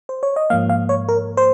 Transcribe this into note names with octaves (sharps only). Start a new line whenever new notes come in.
C5
C#5
D#5
G#2 F3 A#3 F5
F5
C#5
A#4
C5